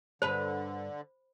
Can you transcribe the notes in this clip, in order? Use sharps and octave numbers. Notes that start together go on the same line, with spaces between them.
G2 D3 B4 C5 B5